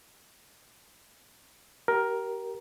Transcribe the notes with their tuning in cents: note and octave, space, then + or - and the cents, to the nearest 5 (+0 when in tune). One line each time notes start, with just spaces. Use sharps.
G4 -25 A#4 +10